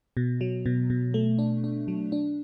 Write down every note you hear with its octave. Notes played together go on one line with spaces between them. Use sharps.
B2
F#3
B2
B2
A3
D4
D4
F#3
D4